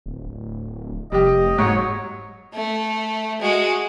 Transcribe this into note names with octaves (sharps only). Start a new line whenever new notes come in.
D1
D1
F1 G3 G4 D#5
G#2 F#3 C#5
A3
G#3 F#4